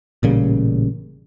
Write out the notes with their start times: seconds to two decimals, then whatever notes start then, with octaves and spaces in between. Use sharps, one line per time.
0.23 A1 A#2 C#3 G3